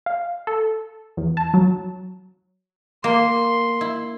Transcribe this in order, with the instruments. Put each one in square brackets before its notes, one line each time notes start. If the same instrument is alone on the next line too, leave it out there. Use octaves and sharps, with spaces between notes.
[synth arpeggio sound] F5
A4
E2
A5
F#3
[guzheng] A#3 [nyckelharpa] C6
[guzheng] E4